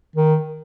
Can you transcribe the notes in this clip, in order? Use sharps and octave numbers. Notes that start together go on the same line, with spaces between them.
D#3